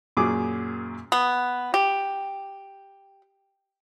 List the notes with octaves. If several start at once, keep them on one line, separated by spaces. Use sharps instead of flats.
F#2 A#2 F#3 G#4 D6 D#6
B3
G4